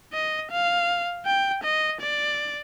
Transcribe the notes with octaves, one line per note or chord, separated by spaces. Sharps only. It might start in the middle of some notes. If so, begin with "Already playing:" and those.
D#5
F5
G5
D#5
D5